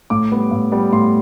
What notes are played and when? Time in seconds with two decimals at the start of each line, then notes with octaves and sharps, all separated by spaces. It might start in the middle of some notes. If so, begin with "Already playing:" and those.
0.10 A2 D6
0.32 G3 B3
0.51 A2
0.72 G3 B3
0.92 A2 C6